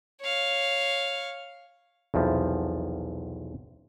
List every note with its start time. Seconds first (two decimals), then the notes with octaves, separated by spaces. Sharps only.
0.20 C#5 F5
2.14 B1 E2 C3 F3